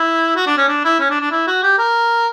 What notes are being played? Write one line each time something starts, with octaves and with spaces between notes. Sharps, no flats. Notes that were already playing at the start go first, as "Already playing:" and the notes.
Already playing: E4
F#4
D4
C#4
D4
E4
C#4
D4
D4
E4
F#4
G4
A#4